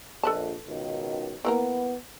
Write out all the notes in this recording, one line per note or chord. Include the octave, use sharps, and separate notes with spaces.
A#1 F2 A4 B4 A5
C#2 B2 D#3
E3 A#3 B3 A#4